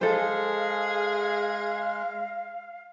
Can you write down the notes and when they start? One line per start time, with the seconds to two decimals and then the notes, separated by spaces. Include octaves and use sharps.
0.01 G#3 G#4 A4 C5 F5